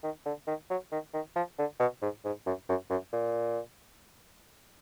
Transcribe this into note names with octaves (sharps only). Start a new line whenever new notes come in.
D#3
D3
D#3
F#3
D#3
D#3
F3
D3
B2
G#2
G#2
F#2
F#2
F#2
A#2